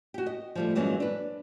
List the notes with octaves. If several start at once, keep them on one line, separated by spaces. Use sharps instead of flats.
F#4 G4
D#5
F3 G3 A3
G2 E3 F#3 G#3 A#3 C#4
D4 B4